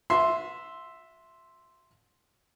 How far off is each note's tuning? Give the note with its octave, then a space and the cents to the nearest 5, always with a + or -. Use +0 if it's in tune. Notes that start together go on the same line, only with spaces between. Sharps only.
F#4 -40 E5 +0 C6 +0